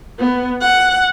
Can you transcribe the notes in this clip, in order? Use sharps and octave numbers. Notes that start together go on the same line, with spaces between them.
B3
F#5